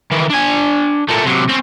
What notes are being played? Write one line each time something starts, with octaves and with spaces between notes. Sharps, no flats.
D#3 E3
D4 G#5
A#2 A3
C3 F#3
C4 C#4